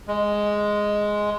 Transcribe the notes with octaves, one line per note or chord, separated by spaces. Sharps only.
G#3